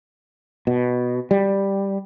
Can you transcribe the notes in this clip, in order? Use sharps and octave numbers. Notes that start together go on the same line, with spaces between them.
B2
G3